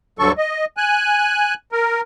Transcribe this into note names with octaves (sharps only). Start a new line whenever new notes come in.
D2 G2 D3 F#3 A4 C#6
D#5
G#5 F#6
A#4